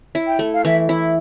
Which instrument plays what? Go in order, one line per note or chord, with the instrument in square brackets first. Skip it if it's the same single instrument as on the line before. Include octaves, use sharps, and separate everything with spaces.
[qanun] E4
[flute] G5
[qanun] A3
[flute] F5
[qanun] E3 [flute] E5
[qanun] E4